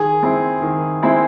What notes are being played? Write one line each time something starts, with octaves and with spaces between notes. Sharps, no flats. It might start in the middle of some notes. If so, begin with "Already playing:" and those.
Already playing: D#3 G#4
G#3 C4 E4
D#3
G#3 C4 E4